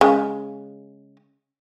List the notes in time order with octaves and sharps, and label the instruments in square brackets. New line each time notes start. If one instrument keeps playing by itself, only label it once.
[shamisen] C#3 G#3